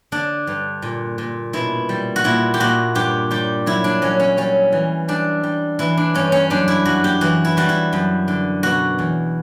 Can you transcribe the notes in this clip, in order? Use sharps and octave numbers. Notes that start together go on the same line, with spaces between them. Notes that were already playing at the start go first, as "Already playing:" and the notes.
D3 D4
G2
A#2
A#2
B2 E4
G3
F#4
A#2 E4
G4
A#2 F#4
G2 G4
G3 G4
F#3 E4
D4
F#3 C#4
C#4
G3 C#4
E3
G3 D4
G3
E3 E4
D4
G2 C#4
C#4
F#2 D4
E4
F#2 F#4
G4
E3 F#4
E4
G3 F#4
E4
F#2
D3
B2 F#4
E2